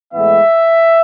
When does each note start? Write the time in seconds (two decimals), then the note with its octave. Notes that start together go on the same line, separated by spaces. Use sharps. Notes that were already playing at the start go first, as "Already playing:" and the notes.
0.14 A2 E3 G#3 B3 E5